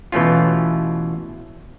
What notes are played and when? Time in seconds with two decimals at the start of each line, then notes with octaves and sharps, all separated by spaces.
0.12 B2 E3 A3 C#4 F4